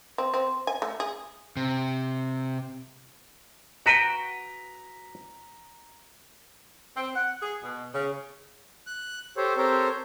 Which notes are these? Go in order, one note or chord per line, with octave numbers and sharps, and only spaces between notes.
C4
C4
G#5
A3
G#4
C3
F#4 B4 G5 A#5 B6
C4
F#5
G#4
B2
C#3
F#6
G4 A4 C5 C#5
C4 G4 A4 A#4 C5 C#5